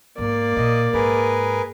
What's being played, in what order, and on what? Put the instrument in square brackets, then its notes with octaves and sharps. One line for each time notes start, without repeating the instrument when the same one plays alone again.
[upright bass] G#2 [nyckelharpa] A#3 D5
[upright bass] A#2 [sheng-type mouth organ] D#5
[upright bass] G#2 [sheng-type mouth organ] G#4 A#4 B4